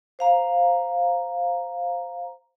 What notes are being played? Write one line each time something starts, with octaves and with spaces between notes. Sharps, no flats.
C5 F5 A#5